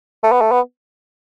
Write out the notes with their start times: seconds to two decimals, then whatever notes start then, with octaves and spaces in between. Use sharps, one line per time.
0.23 A3
0.32 B3
0.41 A3
0.52 B3